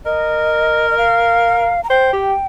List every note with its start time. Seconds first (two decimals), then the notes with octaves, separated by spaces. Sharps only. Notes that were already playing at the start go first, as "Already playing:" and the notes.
0.05 A#4 D#5
0.91 D#5
0.98 F5
1.84 A#5
1.90 C5 G5
2.13 G4